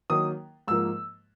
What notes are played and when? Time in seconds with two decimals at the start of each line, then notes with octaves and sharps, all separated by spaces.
0.10 D#3 F#3 A#3 D#6
0.68 G#2 F3 A#3 E6